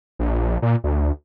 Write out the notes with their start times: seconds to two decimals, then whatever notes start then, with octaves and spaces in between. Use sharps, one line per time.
0.19 A#1
0.62 A#2
0.84 D2